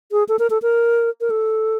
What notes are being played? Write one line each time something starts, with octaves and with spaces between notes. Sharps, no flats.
G#4
A4
A#4
A4
A#4
A#4
A4